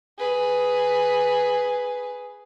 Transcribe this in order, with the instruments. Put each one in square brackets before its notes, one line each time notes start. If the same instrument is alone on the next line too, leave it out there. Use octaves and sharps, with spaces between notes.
[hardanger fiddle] G#4 B4